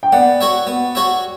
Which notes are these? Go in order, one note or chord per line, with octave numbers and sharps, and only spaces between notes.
G5
B3 D5 F#5
F#4 C#5 E5
B3
F#4 C#5 E5